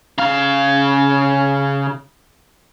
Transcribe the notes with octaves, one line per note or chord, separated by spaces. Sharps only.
C#3 F5